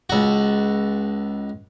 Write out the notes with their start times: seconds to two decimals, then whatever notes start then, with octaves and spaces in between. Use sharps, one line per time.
0.10 C#2 F#4